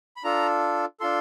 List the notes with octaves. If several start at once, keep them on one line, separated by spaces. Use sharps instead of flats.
B5
D4 F4 A4 A#5
D4 F4 A4 C6